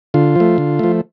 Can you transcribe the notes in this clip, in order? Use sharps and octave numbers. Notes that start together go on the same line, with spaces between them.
D3 F4
F3 A3
D3
F3 A3